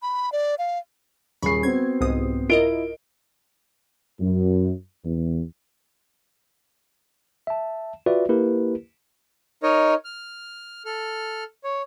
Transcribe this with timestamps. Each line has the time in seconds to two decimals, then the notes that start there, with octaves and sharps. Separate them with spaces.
0.02 B5
0.32 D5
0.59 F5
1.42 D#1 G#4 B5 C#6 C7
1.63 B3 C4 F#4 G#6
2.01 C2 G#2 D#6
2.50 E4 F4 A#4 D#5 D7 G7
4.20 F#2
5.04 E2
7.47 E5 A5
8.06 F4 F#4 B4 D5 E5
8.29 A#3 E4 G4 A#4 B4
9.63 D#4 A#4 C#5 D#5
10.05 F6
10.85 A4 F6
11.64 C#5